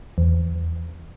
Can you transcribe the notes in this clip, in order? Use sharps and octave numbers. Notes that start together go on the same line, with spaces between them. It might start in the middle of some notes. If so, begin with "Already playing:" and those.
E2